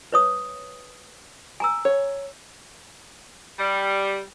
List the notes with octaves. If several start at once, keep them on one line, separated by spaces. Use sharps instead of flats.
B4 C#5 D#6
G#5 A#5 E6
C#5
G3